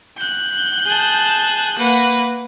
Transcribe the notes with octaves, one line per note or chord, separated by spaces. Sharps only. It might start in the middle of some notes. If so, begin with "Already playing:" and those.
F#6 G6
G#4 A5
A#3 B4 F#5